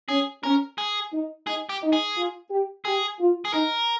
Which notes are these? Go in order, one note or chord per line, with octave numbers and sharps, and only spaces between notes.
C#4 G#4
C#4 A#4
G#4
D#4
D#4 G#4
G4
D#4
G#4
F4
G4
G4 G#4
F4
G#4
D#4 A#4